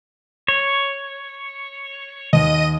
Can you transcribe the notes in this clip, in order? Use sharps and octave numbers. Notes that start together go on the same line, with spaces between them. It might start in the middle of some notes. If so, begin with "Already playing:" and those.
C#5
D#2 D#5 D#7